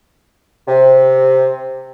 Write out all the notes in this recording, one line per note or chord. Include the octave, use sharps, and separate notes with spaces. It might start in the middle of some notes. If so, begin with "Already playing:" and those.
C3